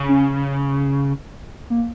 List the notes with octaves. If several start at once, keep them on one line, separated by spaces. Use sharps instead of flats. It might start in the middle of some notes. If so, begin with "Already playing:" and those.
Already playing: C#3
C#4
A#3